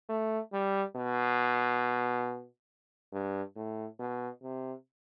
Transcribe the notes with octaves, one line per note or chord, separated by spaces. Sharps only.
A3
G3
B2
G2
A2
B2
C3